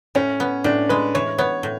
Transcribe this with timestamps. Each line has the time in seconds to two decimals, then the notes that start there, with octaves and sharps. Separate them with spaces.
0.15 A2 C#4
0.40 B3
0.64 A2 D4
0.89 G#3 B4
1.15 E3 C#5
1.38 B3 C#5
1.63 A2